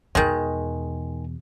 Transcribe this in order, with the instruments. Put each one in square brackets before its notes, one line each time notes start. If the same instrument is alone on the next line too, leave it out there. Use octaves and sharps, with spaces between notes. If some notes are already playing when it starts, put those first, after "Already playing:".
[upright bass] E2 B2 [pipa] D#3 G#3